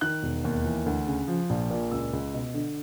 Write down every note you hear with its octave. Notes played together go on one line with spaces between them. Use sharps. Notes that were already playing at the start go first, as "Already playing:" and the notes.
D#3 F#6
E1
D#2
E3
D2
C#3
F3
A#1
A#2
C#2 E6
C#2
B2
D3